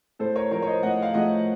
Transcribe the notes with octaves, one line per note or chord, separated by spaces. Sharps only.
A2 A4 C5
A#4 C#5
F3 A3 A#4 C#5
C#5
C5 D#5
A2 D#5 F#5
F5
F3 A3 D#5 F#5